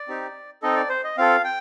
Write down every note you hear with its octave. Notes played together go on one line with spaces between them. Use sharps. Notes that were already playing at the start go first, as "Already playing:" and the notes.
Already playing: D5
C4 D#4 G4
C4 D#4 A4 D#5
D5
C5
D#5
C4 F4 A4 F5
G5